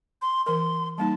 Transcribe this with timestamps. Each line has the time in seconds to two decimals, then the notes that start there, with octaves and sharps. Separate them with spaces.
0.22 C6
0.46 E3 A#4 C6
0.98 G3 A#3 D#4 A5